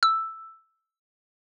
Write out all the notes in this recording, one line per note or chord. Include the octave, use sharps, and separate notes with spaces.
E6